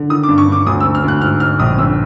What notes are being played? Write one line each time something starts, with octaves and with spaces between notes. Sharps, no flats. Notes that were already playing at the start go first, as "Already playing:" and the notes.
Already playing: D3
D#3 D#6
D6
G2
C#6
G2 D6
D2 D#6
E6
D2
F6
D2 F#6
G#2 F6
G#2 F6
A#1 D#6
G1 E6